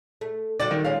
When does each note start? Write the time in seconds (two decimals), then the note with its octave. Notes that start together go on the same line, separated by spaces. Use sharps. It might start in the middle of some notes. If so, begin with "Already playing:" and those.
0.21 A3
0.60 D3 G3 F#4 D5 A6
0.71 D#3
0.84 G#3 C#4 F4 F5